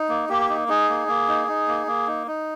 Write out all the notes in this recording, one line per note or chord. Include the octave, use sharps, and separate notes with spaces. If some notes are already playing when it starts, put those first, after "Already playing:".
Already playing: D#4
A#3
A#3 G4
D#4
D#4 G#4
A#3
A#3
D#4
D#4
A#3
A#3
D#4
D#4